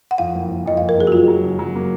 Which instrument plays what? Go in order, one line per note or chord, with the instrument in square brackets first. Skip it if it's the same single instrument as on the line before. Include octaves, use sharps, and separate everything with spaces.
[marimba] F#5
[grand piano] F2 [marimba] F5
[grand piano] F#1
F#1
[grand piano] F2 [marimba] D#5
[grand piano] F#1 [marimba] F5
[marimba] A#4
[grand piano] F#1 [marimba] G#4
[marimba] F#4
[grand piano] F#3 [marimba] F4
[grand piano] F#3
C#3
F#3
A#3